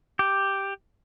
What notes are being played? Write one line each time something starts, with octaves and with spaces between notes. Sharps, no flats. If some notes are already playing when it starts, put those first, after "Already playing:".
G4